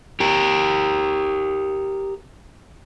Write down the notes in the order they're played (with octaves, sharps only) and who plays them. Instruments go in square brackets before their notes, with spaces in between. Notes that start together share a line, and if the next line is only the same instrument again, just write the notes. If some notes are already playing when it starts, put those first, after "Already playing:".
[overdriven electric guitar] G4 A#4